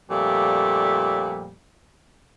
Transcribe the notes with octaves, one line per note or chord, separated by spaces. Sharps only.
F2 A#2 F3 G3 A3